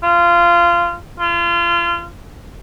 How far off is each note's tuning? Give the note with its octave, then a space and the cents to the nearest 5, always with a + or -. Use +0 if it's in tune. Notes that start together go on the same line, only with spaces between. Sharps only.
F4 -20
F4 -30